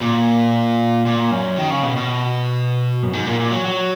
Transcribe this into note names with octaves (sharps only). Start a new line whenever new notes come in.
A#2
A#2
F#2
D#3
C#3
B2
B2
F#2
G#2
A#2
A#2
F#3
F#3